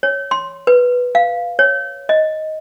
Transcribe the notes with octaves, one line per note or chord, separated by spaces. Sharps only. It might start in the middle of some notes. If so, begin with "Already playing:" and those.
C#5
C6
B4
F5
C#5
D#5